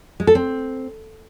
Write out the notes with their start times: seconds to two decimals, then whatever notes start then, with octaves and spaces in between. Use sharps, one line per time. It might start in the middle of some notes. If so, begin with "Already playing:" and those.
0.20 G#3
0.27 A4
0.35 C4